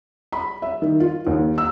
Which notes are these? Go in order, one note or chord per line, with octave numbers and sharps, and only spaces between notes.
B5
E5
D#3
F4
D#2
E6